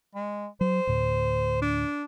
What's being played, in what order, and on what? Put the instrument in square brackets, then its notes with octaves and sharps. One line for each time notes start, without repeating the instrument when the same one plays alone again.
[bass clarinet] G#3
[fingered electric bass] F#3 [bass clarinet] C5
[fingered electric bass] D2 A2
[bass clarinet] D4